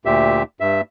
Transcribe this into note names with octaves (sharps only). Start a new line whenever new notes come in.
D2 A#2 G4 E5
G2 E5